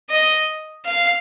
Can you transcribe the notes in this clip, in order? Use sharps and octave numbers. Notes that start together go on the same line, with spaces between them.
D#5
F5